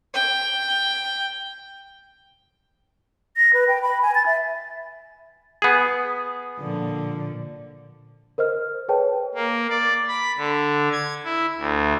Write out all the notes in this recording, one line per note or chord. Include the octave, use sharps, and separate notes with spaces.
G5
A#6
B4
G5
B5
G#5
A6
E5
B3 G#4
A#2 D3 F3
A#4 C5 D#5 F6
G#4 B4 C#5 G5 A5
A#3
D5
B5
D3
G#6
E4
D2